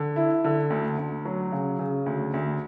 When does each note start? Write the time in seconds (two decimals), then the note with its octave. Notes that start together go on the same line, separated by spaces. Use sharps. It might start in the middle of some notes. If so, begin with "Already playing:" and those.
Already playing: D3
0.16 E4
0.44 D3
0.70 D2
0.98 D2
1.25 F#3
1.52 C#3
1.79 C#3
2.06 D2
2.34 D2